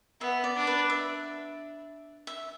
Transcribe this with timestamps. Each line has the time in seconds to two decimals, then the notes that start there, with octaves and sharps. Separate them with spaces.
0.21 B3 E5
0.44 D5
0.56 D4
0.67 B4
0.90 E5
2.27 E5